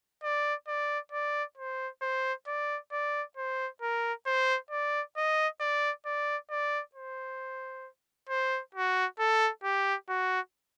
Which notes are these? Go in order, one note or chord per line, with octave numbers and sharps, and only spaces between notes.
D5
D5
D5
C5
C5
D5
D5
C5
A#4
C5
D5
D#5
D5
D5
D5
C5
C5
F#4
A4
G4
F#4